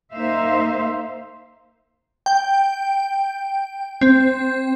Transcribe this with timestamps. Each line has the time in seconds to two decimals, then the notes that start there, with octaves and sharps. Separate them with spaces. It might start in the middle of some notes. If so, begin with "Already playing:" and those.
0.14 A#3 D#4 C5 E5 F5
2.26 G5
4.01 C4